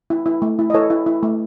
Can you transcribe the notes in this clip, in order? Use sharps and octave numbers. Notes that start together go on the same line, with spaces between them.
E4
E4
A3
E4
D#5
E4 A4 C#5
E4
E4
A3